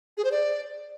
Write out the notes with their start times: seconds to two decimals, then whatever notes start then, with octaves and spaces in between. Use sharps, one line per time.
0.17 G#4
0.25 C5
0.32 D5